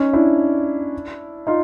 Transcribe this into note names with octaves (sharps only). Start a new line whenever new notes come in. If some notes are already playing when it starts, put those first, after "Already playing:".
Already playing: C#4 D#4
D4 E4
D#4 F4